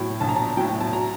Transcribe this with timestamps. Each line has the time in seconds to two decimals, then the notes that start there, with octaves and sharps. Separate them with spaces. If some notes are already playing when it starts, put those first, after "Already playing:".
Already playing: A2 F#3 G5
0.20 A#1 A5
0.29 A#5
0.36 A5
0.57 A2 F#3 G5
0.81 A5
0.93 A#5